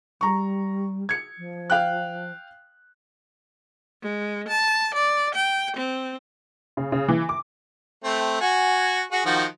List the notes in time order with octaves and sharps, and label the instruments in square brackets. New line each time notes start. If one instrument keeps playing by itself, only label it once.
[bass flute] G3 [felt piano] A#5 C#6
[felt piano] G#6 C#7
[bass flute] F3
[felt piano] F5 G5 F#6
[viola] G#3
A5
D5
G5
C4
[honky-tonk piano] C#3
C#3
E3
D6
[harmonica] A3 C4
F#4 G#5
F#4 G#4
D#3 F3 F#4